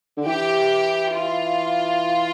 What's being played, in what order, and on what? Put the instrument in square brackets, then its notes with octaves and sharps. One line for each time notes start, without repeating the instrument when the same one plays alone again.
[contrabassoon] D3
[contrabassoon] E3 [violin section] G4
[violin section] F4